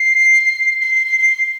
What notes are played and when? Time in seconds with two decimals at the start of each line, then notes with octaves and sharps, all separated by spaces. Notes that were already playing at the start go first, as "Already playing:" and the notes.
Already playing: C7
0.82 C7
0.95 C7
1.07 C7
1.20 C7